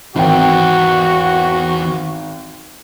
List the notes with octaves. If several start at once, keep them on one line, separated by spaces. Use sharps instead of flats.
G#1 E2 F#4 G5